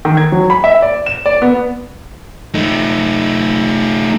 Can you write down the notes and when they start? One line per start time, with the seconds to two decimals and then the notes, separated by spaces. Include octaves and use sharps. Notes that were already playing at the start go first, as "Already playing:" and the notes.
0.05 D#3
0.17 G#6
0.32 F#3
0.50 B5
0.64 E5
0.82 D5
1.06 E7
1.26 D5
1.42 B3
2.54 A3 D#4